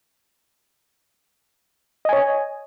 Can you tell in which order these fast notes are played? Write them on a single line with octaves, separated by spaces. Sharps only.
D#5 G#5 C#5